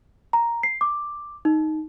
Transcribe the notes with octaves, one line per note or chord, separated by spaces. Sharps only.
A#5
C7
D6
D#4